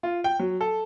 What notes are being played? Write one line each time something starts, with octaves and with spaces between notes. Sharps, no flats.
F4
G5
F#3
A4